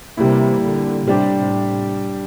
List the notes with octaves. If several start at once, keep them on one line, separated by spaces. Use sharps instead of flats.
C3 E3 G3 A#3 E4
A#2 D3
A2 C3 G3 D4 G4
A2 C3